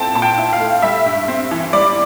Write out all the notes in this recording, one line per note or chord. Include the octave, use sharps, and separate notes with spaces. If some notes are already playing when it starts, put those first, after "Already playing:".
Already playing: A#2 A3 C4 E4 G5 A5
A#2 A5
G5
E4
F5
A3
G3 E5
G2
C4
E3
G3 D5